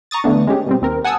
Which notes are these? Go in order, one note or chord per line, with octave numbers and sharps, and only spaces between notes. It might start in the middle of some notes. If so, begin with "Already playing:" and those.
A#5 C#6 D#6 A6
D3 E3 A3 B3 D4
G#3 C#4 G4 G#4
B2 G3 C4
D#2 C4 A#4
F#5 G#5 A5 D#6 E6